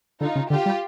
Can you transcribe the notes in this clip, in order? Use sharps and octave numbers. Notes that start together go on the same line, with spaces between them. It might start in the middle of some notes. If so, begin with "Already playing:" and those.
D3 D#4 F4
C#3
D3 F4 G4
G3